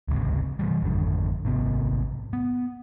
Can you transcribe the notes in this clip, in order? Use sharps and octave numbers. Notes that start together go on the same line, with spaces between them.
D1 G#1 C#2 C3
C3 E3 G3
G#1 F2 D3
G#1 C3 B3
B3